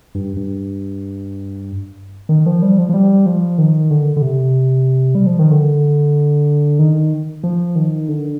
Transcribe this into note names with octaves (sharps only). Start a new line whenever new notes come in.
G2
G2
D#3
F3
G3
F3
F3
G3
F3
D#3
D3
D3
C3
G3
F3
D#3
D3
D#3
F3
D#3
D3